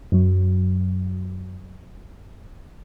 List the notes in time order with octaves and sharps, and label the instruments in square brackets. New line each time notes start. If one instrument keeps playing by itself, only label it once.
[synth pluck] F#2 F#3